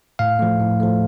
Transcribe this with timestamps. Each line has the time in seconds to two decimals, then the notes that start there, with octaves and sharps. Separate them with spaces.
0.19 A2 F5
0.39 F3 A3
0.60 A2
0.80 F3 A3